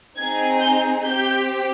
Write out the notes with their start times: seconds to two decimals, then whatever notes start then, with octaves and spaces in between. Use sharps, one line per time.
0.17 C4 D#4 G#4 G#6
0.62 G6
1.05 C4 G4 G6